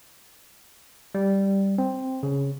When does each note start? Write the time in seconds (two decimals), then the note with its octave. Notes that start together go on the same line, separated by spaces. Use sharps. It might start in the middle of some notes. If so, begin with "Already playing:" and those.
1.15 G3
1.78 C4
2.23 C#3